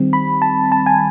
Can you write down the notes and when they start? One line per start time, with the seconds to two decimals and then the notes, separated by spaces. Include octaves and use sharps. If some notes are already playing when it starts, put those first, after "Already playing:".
Already playing: D#3 G3 C4
0.13 B5
0.42 A5
0.72 A5
0.86 G#5